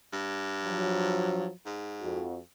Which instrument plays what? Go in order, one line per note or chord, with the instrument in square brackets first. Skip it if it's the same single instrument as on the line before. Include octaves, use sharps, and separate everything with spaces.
[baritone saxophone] G2
[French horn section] F3 F#3
[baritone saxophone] G#2
[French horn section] F2 F#4